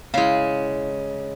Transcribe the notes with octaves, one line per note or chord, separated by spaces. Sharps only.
C#3 G#3 E4 F5